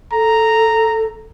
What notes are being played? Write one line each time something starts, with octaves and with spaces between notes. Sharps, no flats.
A4 A#5